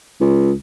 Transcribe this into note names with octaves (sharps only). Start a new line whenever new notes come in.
C#2